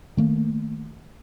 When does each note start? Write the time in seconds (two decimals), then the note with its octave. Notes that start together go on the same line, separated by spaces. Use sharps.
0.17 D#3 A3 A#3